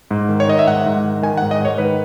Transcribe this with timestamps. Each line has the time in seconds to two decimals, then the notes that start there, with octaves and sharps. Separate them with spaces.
0.11 G#2
0.29 D#3
0.40 C#5
0.48 D#3 D#5
0.59 E5
0.67 G#2 F#5
0.86 G#2
1.04 D#3
1.23 D#3 G#5
1.37 F#5
1.42 G#2
1.51 D#5
1.60 G#2 C#5
1.78 D#3 B4